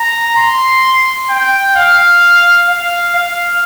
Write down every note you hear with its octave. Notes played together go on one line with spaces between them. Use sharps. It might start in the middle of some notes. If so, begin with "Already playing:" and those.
Already playing: A#5
C6
G5
F5
F5
F5